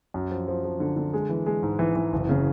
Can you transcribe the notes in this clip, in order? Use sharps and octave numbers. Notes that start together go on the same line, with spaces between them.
F#2
F3
F3
F3
D3
D3
G#3
E3
G#3
G#2
E3
E3
F#1
C#3